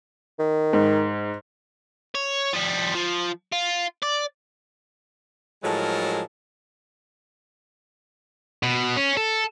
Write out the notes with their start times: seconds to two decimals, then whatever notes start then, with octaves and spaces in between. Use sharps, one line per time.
0.39 D#3
0.73 G#2
2.15 C#5
2.54 F3 G3
2.94 F3
3.52 F4
4.02 D5
5.64 A2 F3 F#3 G#3 A4 A#4
8.63 B2
8.96 C#4
9.17 A4